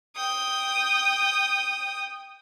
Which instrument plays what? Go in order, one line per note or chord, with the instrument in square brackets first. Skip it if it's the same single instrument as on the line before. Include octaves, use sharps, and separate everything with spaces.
[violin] G5 D#6